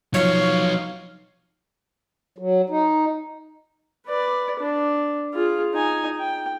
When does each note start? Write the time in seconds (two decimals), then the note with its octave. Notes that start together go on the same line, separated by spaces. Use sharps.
0.14 F3 F#3 D#4 C#5 F5
2.38 F#3
2.70 D#4
4.07 B4 D5
4.60 D4
5.34 F4 G#4
5.74 D#4 G#5
6.20 G5